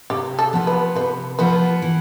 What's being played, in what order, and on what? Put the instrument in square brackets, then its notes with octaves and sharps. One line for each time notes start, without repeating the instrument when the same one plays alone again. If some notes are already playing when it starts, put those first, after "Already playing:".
[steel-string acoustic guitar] C3 [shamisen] G4
[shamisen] A4
[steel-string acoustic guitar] F3 B3 F4
[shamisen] B4
[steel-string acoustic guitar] C3 [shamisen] B4
[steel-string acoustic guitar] F3 B3 F4 [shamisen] B4
[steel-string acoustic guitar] E3